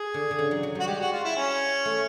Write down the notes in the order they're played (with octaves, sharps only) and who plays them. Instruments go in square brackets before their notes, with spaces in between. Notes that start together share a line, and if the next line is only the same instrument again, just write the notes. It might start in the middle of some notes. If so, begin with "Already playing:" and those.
Already playing: [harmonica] G#4
[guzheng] D3
D3
C#3
F#3
F#3
[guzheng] G3 [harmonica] F#4
[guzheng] G#3 [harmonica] G4
[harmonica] F#4
F4
E4
C#4
[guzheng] A3